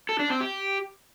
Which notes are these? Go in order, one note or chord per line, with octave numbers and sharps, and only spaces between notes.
A4
D4
C4
G4